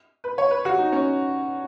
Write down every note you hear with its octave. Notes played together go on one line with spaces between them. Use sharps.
B4
C#5
B4
F#4
D#4
C#4